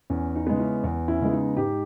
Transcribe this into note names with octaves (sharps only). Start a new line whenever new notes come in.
E2 C#4
D#4
C#3 G#3 B3
C#4 E4
E2
C#4 E4
C#3 G#3 B3
D#4
G#2 D#4 G4